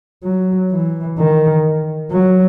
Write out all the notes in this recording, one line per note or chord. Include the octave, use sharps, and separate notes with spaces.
F#3
E3
D#3
F#3